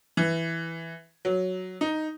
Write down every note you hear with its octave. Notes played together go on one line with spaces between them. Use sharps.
E3
F#3
D#4